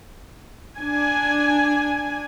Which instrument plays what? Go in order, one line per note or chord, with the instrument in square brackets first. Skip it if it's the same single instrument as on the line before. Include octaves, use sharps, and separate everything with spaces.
[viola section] D4 G#5